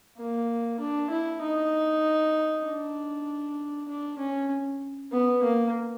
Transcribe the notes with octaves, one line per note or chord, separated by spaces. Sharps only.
A#3
D4
E4
D#4
D4
D4
C#4
B3
A#3